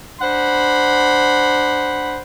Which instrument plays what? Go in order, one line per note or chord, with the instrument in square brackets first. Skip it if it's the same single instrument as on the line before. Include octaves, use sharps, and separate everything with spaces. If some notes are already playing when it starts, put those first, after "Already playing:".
[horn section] D4 C5 F#5 B5